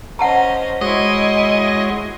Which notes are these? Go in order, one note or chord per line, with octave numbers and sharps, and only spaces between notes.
C#4 C5 D#5 F#5 A5 A#5
G#3 E4 F#4 C#5 D#5 G#5 C6